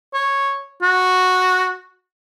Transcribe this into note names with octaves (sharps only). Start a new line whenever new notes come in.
C#5
F#4